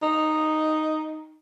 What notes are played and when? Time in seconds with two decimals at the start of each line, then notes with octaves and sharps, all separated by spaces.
0.02 D#4